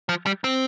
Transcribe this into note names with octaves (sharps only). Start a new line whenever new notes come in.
F3
G3
C4